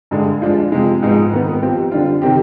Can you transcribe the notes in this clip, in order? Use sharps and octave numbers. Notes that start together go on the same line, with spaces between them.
G2 D3 G#3
F3 G#3 D4 F4
C3 F3 G#3
G#2 F3 G#3 B3 D#4
G#2 D#3 B3
F3 C4 G4
D3 G3 D4 F4
C3 D#3 G3 C4 G4